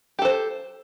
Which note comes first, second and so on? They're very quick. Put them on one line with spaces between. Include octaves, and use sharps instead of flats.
G4 A4 C5